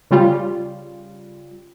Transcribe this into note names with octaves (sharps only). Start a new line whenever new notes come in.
C#3 G3 F4